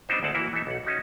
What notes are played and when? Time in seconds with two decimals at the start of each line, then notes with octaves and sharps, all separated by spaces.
0.09 G3 B3 C4 D4 D#4 C5
0.23 D2 G#3 C4 F#5 A5
0.34 E3 A#3 E4 F#4
0.53 E3 D#4 A4 C5 E5
0.67 B1 F#5
0.84 C#4 D#4 F#4 E5